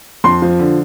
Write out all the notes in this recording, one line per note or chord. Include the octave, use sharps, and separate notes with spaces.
F2 C6
F3
D3